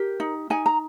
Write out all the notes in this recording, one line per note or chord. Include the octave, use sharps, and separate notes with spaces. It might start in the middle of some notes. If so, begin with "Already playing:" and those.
Already playing: G4 A#4
D#4
D#4 G#5
A#5